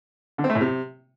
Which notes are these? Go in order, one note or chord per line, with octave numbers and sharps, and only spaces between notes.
D3
C4
A3
A2
C3